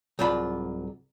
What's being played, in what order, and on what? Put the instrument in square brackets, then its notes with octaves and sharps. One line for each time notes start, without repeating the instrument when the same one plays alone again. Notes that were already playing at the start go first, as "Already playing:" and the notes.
[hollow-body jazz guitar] C2 G#2 F#3 F4 D5 B5